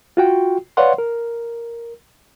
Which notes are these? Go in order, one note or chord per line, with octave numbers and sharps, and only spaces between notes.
F4 F#4 G5
B4 C#5 D5 F5 F#5 C6
A#4